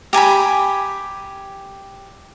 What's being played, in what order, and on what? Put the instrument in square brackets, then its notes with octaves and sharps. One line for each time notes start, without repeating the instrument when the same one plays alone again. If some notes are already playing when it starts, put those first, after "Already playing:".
[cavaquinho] G4 G#5 A#5 B5